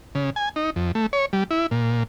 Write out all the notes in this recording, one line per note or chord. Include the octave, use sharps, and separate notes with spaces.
C#3
G#5
D#4
F2
A3
C#5
G3
E4
A#2